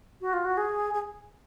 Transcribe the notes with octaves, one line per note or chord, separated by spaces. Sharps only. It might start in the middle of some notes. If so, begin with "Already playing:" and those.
F#4
F4
F#4
G#4
G#4